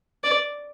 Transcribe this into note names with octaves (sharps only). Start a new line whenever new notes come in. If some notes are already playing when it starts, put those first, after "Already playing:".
D5